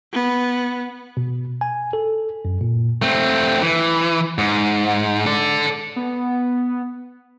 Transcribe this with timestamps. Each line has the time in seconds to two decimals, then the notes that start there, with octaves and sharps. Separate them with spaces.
0.13 B3
1.17 B2
1.61 G#5
1.93 A4
2.45 F#2
2.61 A#2
3.02 A3 C4
3.62 E3
4.38 G#2
5.26 A4 D5
5.96 B3